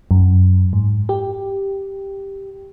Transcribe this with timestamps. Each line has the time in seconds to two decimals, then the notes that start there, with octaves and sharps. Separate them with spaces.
0.11 F#2
0.73 G#2
1.09 G4